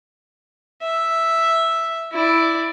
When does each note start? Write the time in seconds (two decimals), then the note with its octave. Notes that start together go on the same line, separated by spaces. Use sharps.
0.82 E5
2.12 E4 D5